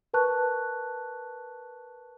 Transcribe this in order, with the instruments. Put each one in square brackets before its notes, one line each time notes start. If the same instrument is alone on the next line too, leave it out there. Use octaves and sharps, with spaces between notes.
[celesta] A#4 B4 A5 C#6 F#6